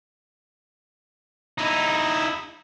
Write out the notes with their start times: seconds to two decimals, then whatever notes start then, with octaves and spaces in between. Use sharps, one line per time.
1.58 D#4 E4